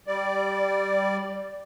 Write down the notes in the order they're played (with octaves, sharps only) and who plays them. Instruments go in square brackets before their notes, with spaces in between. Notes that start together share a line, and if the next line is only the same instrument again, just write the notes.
[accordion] G3 D5